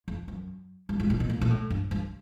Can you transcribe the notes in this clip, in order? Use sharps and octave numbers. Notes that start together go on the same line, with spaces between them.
F2
F#2
G2
G#2
A#2
B2
A#2
A#2
A2
G2
G2